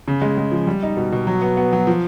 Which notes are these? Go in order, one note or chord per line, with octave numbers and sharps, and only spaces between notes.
C#3
G#3
G#3
F3
G3
D#4
B2
B2
F#3
B3
B3
F#3
F3